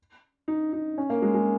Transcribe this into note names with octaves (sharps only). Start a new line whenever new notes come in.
D#4
D#4
C#4
A#3
G#3
G#3